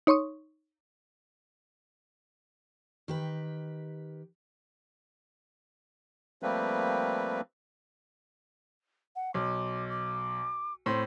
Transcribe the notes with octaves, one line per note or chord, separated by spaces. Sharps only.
D#4 C#5 C6 C#6 D#6
D#3 G4 B4
F3 G3 A3 A#3 C4 B4
F#5
B1 D6
D6
A2 C4 C6